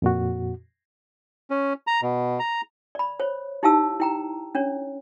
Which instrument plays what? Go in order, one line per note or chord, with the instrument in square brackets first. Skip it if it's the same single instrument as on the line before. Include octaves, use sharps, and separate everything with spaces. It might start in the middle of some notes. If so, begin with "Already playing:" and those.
[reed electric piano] F2 A#2 F#4
[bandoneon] C#4
A#5
B2
A#5
[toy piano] D5 B5
C5 C#5
D#4 E4 G4 F5 A5 E6
E4 G5 A#5
C#4 D4 C#5